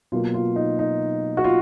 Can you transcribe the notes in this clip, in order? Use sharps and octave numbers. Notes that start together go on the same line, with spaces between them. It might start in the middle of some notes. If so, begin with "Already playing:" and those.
B2 F#3 A#3 F4
F4
D#4
D#4
F#4
F4